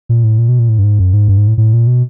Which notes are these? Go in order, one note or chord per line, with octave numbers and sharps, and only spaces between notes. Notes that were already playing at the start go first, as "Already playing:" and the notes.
A#2
A2
A#2
B2
A#2
A2
G2
G#2
F#2
G#2
G2
G#2
A2
A2
A#2
B2